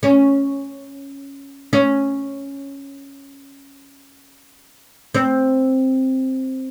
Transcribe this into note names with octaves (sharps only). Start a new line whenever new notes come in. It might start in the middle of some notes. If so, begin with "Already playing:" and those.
C#4
C#4
C4